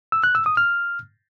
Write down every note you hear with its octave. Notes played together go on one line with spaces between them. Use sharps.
E6
F#6
E6
D#6
F6